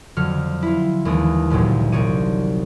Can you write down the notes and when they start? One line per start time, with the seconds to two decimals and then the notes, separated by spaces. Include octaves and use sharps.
0.16 F2 D3 F#3 F6 C#7
0.63 E4 F4
1.05 D#2 E3 G#3 D4 D#6
1.50 G1 D2 A#2 F#3 G3
1.92 C2 D#4 C#5 D5 D#7